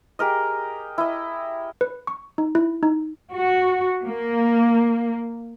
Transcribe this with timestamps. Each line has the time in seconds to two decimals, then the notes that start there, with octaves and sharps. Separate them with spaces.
0.19 G4 G#4 A#4 D#5
0.98 E4 D#5
1.81 B4
2.07 C#6
2.38 D#4
2.55 E4
2.83 D#4
3.32 F#4
4.04 A#3